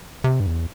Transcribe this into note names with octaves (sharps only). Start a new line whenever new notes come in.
C3
G2
E2